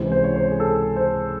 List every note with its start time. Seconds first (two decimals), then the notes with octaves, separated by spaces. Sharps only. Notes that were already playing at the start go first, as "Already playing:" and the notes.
Already playing: C#2 C3 E3 G#3 C5
0.12 C5
0.24 C#5
0.36 C5
0.51 G#4
0.60 A4
0.96 C5